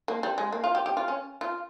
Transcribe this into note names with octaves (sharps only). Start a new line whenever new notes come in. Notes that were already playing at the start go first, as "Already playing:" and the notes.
A#3
G3
G#3
A#3
F4
G4
G4
F4
C#4
F4